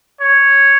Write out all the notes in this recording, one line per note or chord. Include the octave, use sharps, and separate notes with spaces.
C#5